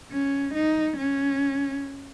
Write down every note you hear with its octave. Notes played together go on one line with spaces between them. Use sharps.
C#4
D#4
C#4